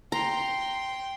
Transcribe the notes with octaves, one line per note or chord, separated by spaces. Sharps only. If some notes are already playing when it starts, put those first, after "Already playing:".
G5 A#5 C6